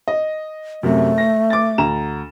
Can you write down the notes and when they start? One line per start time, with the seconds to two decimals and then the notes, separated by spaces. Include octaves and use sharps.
0.08 D#5
0.83 F#2 C3 A3
1.18 A#6
1.50 D6 A6
1.78 D2 A#5 E7